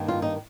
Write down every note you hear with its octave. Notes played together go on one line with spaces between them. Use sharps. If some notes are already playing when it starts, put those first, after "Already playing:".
Already playing: G2 D#3 A#3
F4
D#4